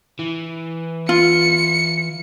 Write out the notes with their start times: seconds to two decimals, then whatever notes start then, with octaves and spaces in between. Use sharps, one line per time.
0.19 E3
1.09 F4 C#7